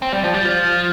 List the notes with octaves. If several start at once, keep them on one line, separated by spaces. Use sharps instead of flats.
C4
G3
F3
G3
F3